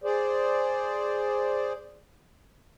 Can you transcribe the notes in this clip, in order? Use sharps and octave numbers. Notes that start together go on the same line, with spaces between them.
G#4 C5 D5